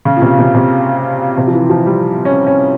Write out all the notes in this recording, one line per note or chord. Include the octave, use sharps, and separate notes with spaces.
C#3
A#2
C3
C3
C3
C3
F3
E3
F3
G3
C#4
C#4